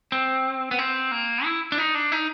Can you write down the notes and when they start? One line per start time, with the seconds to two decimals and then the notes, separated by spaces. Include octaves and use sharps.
0.12 C4
0.71 B3
0.79 C4
1.12 A#3
1.45 E4
1.72 D4
1.78 D#4
1.95 D4
2.12 D#4